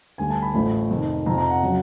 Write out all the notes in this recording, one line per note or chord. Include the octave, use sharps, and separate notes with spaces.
D2 D3 G3 G#5
A5
B5
A1 A2 F3 A3 B5
F2 C3 D#3
F2 C3 F3 A#5
A#5
F#5
C#3 F#3